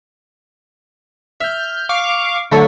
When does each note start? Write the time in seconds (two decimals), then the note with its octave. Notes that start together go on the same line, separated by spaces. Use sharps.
1.41 E5 F6 G6
1.89 F5 C#6 D6
2.52 D3 F#3 A3 A4 C#5